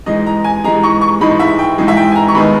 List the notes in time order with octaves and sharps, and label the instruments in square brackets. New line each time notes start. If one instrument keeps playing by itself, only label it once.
[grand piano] G#2 E3 G#3 D#4 D#5
A#5
G#5
G#2 E3 G#3 D#4 A#5
C#6
C#6
G#2 E3 G#3 D#4 B5
E5
G5
G#2 E3 G#3 D#4
E5
G5
G#5
A#5
C#6
D#2 D#3 G#3 B3 D#4 B5